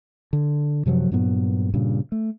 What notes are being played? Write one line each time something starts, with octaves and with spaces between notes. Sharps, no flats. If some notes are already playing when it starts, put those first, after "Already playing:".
D3
F#2 C3 F3 F#3
G2 A#2 F#3 B3
G2 A#2 C#3
A3